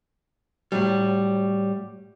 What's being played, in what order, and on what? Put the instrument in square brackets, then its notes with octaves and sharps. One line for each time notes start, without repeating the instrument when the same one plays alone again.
[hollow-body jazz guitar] A2 F#3 G3